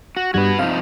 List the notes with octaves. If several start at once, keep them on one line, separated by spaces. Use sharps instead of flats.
F#4
G2 G3 F#4 B4 G#6
C3 F3 D#4 F5